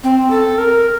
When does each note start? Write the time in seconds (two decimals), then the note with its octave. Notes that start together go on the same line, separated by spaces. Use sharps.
0.04 C4
0.30 A4
0.58 A#4